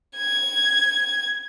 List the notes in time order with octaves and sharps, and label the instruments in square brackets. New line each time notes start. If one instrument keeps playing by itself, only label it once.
[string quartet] G#6